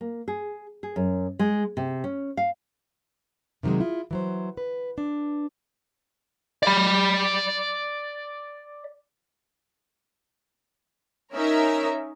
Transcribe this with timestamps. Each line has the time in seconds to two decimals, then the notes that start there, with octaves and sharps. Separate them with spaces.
0.01 A#3
0.28 G#4
0.83 G#4
0.96 F#2
1.39 G#3
1.77 C3
2.04 C#4
2.37 F5
3.63 C3 D#3 F3 F#3 G#3
3.80 E4 F4
4.11 E3 F#3 C5
4.57 B4
4.98 D4
6.63 D5 B5
11.34 C#4 D#4 A#4 E5